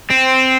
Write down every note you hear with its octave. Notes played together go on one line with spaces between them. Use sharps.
C4